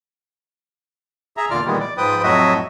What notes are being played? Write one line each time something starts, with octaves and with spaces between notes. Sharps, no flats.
G#4 E5 A#5
E2 A#2 D3 F4 D5 F6
A#2 D#3 E3 G3 G#3 B3
D5
G#2 F3 B4 G5 D#6
F2 A2 F#3 F#4 D#5 E5